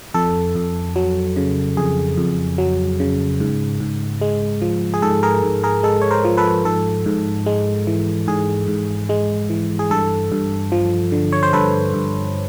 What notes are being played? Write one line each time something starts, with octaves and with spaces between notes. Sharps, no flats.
F2 A4
F2
F#3
C#3
F2 G#4
F2
F#3
C#3
G#2
G#2
G#3
F3
G#4
G#2 A4
G#4 A#4
G#2
G#4 A#4
G#3 A4
C#5
A#4 C5
F3
A4 B4
G#2 A4
G#2
G#3
E3
G#2 G#4
G#2
G#3
E3
G#4
G2 A4
G2
F3
D3
C#5
C5
G2 A4 B4
G2